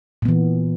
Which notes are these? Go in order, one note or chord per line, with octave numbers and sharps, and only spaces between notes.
A#2 E3 B3